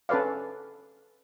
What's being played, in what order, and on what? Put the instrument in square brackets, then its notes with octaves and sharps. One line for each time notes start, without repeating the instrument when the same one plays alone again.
[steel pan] C#4 A4 B4 D5 F5